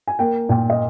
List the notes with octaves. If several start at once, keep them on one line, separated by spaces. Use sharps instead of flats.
G#5
A#3 G5
A#2 G5
D#5